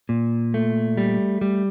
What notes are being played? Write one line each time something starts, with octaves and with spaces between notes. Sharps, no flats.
A#2
A3
G3
G3